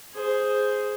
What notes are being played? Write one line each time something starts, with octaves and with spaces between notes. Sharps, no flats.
G#4 C5